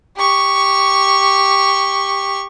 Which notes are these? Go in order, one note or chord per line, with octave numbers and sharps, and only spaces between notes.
G4 C#6